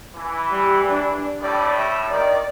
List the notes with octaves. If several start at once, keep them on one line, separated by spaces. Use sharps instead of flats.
E3
G3
D4
A2 G3 D5
E5
D#3 D5